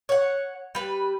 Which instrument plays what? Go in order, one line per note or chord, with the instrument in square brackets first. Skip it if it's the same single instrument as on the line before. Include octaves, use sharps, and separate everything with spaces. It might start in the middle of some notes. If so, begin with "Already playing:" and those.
[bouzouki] C#5 F#5
G3 B4